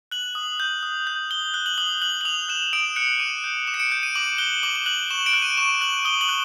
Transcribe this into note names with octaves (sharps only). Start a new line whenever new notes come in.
F#6 F#7
D#6
G6
D#6
G6
D#6 G7
F#6
F#7
D#6 F#7
F#6 F#7
F#7
D#6 F7
F#6 E7
D#6 D7
F#6 C#7
D6 D#7
G6
D6 E7
C#7
D7
G6 D7
D#7
D6 F#7
F#6 G7
D6 F#7
G7
F#6 F#7
C#6 E7
D7
F#6
D#7
C#6 E7
F#6 F#7
D#6 G7
F#7
F#6